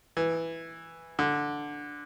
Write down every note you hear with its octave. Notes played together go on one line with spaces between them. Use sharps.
E3
D3